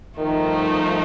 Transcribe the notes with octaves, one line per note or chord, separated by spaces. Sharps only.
G2 D#3 F3 A3 D#4